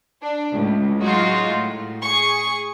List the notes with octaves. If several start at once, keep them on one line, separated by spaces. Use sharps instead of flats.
D4
C#2 A2
F#3 G#3 D#4 F4 F#4
A2
G#4 C#6